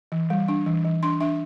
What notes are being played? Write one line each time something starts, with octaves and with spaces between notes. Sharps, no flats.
E3
G3
D4
E3
E3
D4 C6
D4 E5